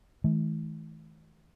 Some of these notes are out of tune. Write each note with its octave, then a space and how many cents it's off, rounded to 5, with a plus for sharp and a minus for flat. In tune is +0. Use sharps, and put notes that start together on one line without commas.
D#3 +45 A3 -40